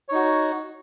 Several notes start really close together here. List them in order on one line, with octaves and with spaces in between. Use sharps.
C#5 D#4 F#4